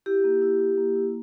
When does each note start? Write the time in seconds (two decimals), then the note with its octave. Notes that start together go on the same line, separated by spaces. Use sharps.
0.06 E4 G4
0.24 A#3
0.42 E4
0.60 E4
0.77 A#3
0.96 E4